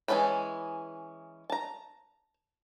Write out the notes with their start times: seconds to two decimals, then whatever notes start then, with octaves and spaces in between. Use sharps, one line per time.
0.08 E3 G#3 C#4 A5 B5
1.50 A5 A#5